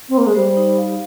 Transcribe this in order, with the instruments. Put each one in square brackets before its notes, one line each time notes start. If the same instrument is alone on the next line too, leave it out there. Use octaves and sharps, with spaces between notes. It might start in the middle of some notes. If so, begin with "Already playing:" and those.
[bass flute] C4
A#3
G#3
[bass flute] G3 [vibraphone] C5
[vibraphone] D#4
F5